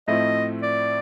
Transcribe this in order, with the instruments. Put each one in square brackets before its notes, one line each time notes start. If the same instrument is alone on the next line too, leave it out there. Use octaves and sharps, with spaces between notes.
[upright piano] A2 F3 A3 C4 E4 [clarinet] D#5
[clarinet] D5